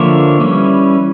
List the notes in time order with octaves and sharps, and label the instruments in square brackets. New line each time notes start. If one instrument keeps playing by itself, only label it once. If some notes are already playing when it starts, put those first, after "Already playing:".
Already playing: [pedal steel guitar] D3 F3 A#3 C#5 E5
E3 G3 C#4